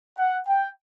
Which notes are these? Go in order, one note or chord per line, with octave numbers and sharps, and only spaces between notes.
F#5
G5